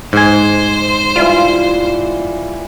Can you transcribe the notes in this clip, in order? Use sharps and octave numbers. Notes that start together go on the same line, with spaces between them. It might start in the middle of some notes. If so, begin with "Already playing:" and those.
G#2 C5 G#5
E3 G3 F4